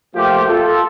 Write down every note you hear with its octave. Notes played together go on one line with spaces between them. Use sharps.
F3 A3 A#3 F4 G4
F4 A4